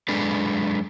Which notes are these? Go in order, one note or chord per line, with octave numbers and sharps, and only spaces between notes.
F#2 G#3 D4 A4 B4